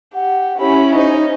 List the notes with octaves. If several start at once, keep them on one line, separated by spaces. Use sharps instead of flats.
G4 F#5
C#4 E4 G4 B5
D#4 C5 D#5